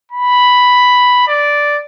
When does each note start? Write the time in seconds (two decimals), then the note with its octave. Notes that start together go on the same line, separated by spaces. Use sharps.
0.12 B5
1.28 D5